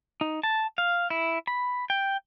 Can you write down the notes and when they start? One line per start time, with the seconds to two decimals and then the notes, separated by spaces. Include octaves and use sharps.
0.21 D#4
0.43 A5
0.78 F5
1.10 E4
1.47 B5
1.90 G5